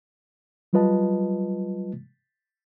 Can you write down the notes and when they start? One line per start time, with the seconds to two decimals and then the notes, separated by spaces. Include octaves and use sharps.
0.73 F#3 G3 F4 B4 D#5 A5